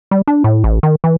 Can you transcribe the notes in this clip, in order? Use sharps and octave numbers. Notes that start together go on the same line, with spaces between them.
G3
D4
A2
A1
D#3
E3